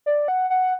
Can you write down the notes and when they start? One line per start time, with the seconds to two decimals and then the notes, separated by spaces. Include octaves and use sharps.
0.06 D5
0.28 F#5
0.50 F#5